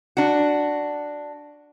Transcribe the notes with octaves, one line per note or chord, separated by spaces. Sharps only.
D4 F#4